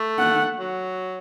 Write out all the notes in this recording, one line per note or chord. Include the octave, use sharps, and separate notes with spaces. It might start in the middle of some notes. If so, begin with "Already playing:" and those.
Already playing: A3
F#5
F#3